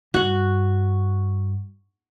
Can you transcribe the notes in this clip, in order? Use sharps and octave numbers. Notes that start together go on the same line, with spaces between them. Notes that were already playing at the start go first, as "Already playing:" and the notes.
G2 F#4 F#5